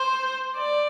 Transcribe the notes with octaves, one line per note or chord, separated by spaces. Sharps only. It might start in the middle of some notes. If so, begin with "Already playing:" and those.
Already playing: C5
D5